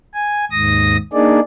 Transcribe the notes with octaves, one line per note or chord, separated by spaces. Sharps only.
G#5
D#2 G#2 D#6 A#6
A#3 D4 D#4 G#4 D5